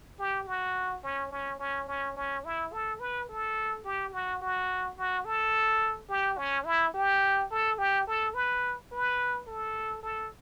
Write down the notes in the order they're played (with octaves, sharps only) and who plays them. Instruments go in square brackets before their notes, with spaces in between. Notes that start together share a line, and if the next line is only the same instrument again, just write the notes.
[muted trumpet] G4
F#4
C#4
C#4
C#4
C#4
C#4
E4
A4
B4
A4
G4
F#4
F#4
F#4
A4
G4
C#4
E4
G4
A4
G4
A4
B4
B4
A4
A4